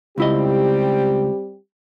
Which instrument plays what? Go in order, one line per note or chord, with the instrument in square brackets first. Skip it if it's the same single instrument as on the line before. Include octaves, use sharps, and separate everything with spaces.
[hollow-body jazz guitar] C#2 E4 D#5 [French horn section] G3 C4 G4